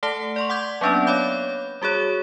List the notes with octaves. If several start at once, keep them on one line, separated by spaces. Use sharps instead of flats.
A3 A4 F#5 A5 B6 G7
D5 C6 C#6
F#5 D6 G6 G#6
F#3 A#3 B3 C#4 D4 D5
C#5 F5 B5 D6 G6
G3 F#4 G#4 C#5